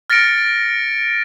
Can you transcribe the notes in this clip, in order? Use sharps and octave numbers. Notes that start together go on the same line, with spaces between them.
F6 A6 A#6 C#7 D7